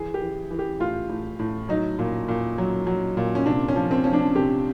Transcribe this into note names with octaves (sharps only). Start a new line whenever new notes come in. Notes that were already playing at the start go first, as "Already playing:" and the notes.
Already playing: E3 G#4
G4
E3
E3
G4
A2 F4
A2
A2
F#3 D#4
A#2
A#2
F#3
F#3
A#2
C#4
C3 D4
C#4
F3
C4
F3 C#4
D4
C3 G4